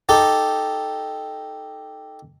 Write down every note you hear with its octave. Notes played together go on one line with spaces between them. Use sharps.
D#4 G4 A4